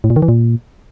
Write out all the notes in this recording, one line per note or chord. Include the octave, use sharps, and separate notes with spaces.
A2
A#2
D#3
E3
A#2